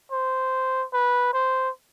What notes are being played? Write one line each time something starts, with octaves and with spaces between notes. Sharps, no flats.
C5
B4
C5